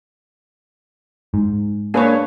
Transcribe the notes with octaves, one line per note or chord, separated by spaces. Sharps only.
G#2
A#3 D4 G#4 B4 C#5